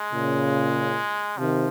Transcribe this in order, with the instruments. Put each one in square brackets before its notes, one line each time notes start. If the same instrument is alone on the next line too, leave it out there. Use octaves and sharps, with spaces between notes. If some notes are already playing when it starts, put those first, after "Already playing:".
Already playing: [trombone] G#3
[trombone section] A#2 C#3
[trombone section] C3 D#3 [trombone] F3